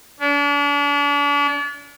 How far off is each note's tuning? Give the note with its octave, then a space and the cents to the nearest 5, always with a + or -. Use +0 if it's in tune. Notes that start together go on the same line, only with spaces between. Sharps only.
D4 -40